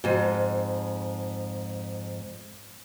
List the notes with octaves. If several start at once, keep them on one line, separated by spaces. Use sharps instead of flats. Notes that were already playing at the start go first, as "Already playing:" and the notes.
F2 G#2